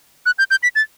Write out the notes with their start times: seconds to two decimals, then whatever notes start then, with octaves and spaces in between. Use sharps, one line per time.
0.26 F#6
0.39 G6
0.51 G6
0.63 B6
0.75 A6